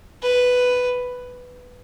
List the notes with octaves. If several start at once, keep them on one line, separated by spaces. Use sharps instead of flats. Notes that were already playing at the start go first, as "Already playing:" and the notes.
B4